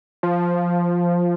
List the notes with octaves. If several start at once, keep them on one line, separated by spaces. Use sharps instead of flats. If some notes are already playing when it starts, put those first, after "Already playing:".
F3